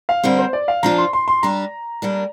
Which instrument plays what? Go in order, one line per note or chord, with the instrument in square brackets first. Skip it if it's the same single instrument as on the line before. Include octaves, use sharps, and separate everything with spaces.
[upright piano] F5
[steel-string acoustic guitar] D3 G3 C4 A#4
[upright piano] C5
D5
F5
[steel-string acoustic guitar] F3 D4 F4 [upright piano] A#5
[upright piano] C6
C6
C6
[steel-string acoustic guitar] G3 D4 G4 [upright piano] A#5
[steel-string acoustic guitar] G3 A#3 D4 A#4